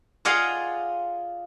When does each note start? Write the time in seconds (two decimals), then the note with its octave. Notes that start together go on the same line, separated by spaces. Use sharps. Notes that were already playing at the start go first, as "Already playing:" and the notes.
0.25 F4 G#4 D5 D#5 F5 F#5